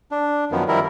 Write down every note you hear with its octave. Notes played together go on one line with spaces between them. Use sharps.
D4
F#2 D#3 F3 B3
D#3 F3 G3 E4 A#4